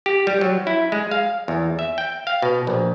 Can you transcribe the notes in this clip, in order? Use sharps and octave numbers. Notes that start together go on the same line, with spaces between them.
G4
G3
F#3
E4
G#3
F5
E2
E5
G5
F5
B2
A#1